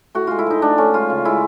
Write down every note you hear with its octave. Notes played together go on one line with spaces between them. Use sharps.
A2 F#4
G#3 F4
E4
F3 D#4
A2 D4
A2 C#4
G#3 F4
C#3
G#3 E4